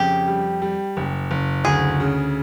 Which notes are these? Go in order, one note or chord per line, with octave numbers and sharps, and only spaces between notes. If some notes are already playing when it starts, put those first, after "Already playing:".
Already playing: F2 C#3 G4
G3
G3
F#1
F#1
D2 G#4
C#3